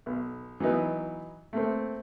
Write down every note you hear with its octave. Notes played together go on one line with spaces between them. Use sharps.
B1
E3 F#3 B3 D#4
A3 A#3 C4